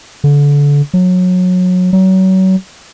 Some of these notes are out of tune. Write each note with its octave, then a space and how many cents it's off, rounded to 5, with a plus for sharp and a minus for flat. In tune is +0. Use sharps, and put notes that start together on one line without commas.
D3 -30
F#3 -25
F#3 +30